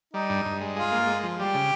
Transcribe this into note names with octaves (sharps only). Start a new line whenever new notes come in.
G3 D#4
G2
G2
G#3
F4 G#4
A#3
G#3
F3
G3 G4
C#3